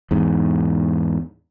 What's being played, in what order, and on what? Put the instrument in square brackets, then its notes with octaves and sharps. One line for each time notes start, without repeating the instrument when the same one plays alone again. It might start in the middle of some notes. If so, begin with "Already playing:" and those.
[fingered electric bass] E2 G#2